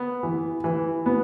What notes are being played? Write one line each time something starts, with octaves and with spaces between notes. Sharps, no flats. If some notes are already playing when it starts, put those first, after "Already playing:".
Already playing: B3
E3
E3
B3